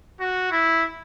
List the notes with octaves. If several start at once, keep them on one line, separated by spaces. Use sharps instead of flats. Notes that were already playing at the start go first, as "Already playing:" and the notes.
F#4
E4